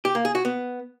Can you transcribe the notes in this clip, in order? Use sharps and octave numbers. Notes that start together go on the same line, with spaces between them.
G4
A#3
G#4
F#4
B3